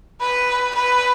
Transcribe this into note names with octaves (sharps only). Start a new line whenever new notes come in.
B4
B4